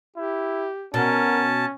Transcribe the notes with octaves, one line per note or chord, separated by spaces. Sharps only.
E4 G4
B2 C#4 A#4 A5